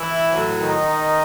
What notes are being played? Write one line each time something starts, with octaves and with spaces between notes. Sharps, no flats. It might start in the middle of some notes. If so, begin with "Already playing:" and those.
Already playing: E3 E4
A2 F#3
D#3 D#4